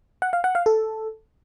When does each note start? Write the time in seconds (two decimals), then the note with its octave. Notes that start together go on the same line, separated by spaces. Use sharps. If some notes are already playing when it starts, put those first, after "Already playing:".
0.22 F#5
0.33 F5
0.44 F#5
0.55 F5
0.66 A4